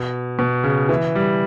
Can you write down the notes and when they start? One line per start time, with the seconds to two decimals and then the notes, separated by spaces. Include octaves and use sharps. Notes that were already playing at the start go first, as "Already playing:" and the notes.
Already playing: B2
0.39 B2
0.64 C#3
0.89 E3
1.15 G3